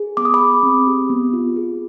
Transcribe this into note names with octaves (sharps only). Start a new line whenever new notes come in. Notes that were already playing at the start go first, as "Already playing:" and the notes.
Already playing: G#4
B3 D6
D#6
B5 D6
G#4
C4
G4
B3
F4
G#4